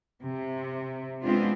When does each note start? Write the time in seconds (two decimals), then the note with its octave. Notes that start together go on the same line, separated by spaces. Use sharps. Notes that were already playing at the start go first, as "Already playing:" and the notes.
0.23 C3
1.23 G#3 B3 C4 D4 F4